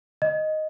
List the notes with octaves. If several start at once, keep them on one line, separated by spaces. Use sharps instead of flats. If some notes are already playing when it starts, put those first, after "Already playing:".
D#5